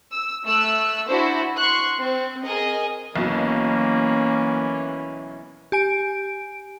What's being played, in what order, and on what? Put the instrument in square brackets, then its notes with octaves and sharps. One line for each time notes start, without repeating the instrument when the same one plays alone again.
[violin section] E6
A3 E6 F#6
D4 E4 F#4 C5
C6 C#6 F#6
C4
G#4 A#4 D#5
[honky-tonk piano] B1 B2 [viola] E3 C#4 [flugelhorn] A#3
[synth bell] G4 G#5 D7